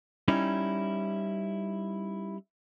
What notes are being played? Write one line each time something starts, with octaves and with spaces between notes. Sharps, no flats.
G3 C#4 D#4 E4